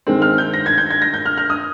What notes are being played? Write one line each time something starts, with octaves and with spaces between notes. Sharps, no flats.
D#3 G#3 C4
F6
G6
A#6
G#6
G6
G#6
A#6
G6
F6
F6
D#6